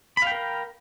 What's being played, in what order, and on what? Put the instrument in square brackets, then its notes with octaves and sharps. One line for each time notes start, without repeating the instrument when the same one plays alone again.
[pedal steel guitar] B5
F5
G5
A#4